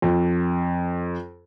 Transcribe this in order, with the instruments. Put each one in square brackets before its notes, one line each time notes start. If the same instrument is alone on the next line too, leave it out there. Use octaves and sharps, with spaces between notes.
[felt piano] F2